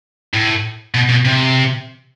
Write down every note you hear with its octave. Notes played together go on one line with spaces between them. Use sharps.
A2
B2
B2
C3